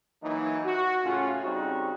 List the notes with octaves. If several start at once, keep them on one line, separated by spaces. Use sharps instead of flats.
E3 F#3 A#3 D#4
F#4
A2 C#3 C#4 F4
C#3 G3 C4 D#4 F#4